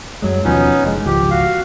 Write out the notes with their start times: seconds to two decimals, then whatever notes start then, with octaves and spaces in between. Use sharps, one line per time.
0.22 F#2 F#3 G#3
0.45 D#2 B2 F3 B3 C#4 D#4
0.84 F1 G#2 G#3
1.06 G#1 C#2 F3 G4
1.31 F#4 F5